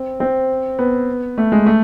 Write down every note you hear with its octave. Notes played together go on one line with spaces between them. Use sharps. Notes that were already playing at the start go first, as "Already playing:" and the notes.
Already playing: C4
C4
B3
A3
G#3
A3